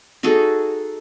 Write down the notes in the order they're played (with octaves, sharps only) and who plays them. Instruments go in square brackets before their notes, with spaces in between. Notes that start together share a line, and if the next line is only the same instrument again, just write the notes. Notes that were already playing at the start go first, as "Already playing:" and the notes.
[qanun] D#4 F#4 G#4 A4